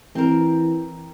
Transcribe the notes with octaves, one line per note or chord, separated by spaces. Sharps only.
E3 C4 A#4